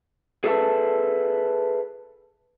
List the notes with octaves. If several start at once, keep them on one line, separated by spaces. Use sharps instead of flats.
G#4 A4 B4 D5 E5 A5